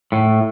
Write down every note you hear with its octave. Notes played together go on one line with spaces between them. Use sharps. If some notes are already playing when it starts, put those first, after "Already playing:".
A2